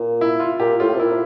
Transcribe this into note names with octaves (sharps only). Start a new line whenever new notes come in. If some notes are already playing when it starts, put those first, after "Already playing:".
Already playing: A#2
E4
F4
A#2 G4
A2 F4
C3
A#2 E4